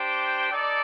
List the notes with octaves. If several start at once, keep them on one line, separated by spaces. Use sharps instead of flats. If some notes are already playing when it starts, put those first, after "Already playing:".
Already playing: D4 G4 C5 G5
D#4 A4 D5